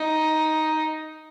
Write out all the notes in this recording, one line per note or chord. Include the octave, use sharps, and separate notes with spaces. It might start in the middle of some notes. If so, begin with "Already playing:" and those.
Already playing: D#4